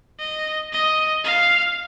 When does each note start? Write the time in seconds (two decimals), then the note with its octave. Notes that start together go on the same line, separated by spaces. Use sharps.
0.19 D#5
0.73 D#5
1.24 F5